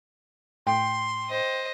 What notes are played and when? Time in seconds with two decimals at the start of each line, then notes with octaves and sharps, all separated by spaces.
0.67 A2 G5 C6
1.30 C5 D#5